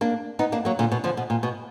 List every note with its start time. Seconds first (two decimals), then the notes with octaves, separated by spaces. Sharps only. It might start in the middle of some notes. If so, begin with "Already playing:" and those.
0.01 A#3 D4
0.39 B3 D#4
0.52 A#3 D4
0.65 F#3 A#3
0.79 A#2 D3
0.92 B2
1.04 D3 F3
1.17 B2
1.30 A#2
1.43 B2